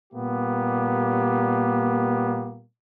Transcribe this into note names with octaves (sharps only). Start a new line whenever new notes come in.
A#2 G3 A#3 B3 G4